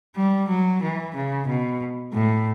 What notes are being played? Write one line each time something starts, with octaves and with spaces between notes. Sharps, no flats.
G3
F#3
E3
C#3
B2
A2